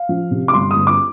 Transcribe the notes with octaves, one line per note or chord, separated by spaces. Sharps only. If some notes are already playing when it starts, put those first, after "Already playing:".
Already playing: F5
F3
C3
D6
G1 C6
D#6
G1
D6